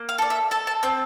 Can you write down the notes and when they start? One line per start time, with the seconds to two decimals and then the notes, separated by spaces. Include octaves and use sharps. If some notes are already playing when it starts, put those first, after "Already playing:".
Already playing: A#3
0.09 F5
0.18 A4 D5
0.30 E5
0.51 A4 A5
0.67 A5
0.83 C4 G6